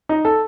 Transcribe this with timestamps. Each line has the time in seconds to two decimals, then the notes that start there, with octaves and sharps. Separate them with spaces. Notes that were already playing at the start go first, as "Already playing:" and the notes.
0.09 D#4
0.25 A4